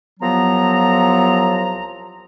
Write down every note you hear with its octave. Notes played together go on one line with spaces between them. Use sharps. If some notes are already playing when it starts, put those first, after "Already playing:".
C2 F3 F#3 B3 A#5